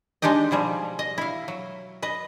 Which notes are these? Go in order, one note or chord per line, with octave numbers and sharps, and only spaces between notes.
G#3 D4 D#4 G4 D#5
B2 F3 G3 G#4
D#5
E4 F5
F#3
B4 D#5